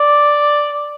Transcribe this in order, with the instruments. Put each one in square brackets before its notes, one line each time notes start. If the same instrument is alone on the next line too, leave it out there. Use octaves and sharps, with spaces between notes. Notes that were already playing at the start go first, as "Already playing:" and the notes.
Already playing: [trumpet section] D5